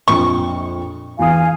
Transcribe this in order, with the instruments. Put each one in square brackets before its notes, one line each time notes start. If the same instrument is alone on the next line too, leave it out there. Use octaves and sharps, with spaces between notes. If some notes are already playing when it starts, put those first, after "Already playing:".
[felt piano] A#1 F2 [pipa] C#6
[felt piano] E2 E3 D#6 [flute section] F5 G#5